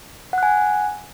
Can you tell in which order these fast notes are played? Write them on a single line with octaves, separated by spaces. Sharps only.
F#5 F#6 G#5